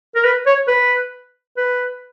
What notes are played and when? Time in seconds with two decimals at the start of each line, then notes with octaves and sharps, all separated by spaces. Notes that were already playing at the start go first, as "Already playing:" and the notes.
0.15 A#4
0.24 B4
0.46 C#5
0.68 B4
1.57 B4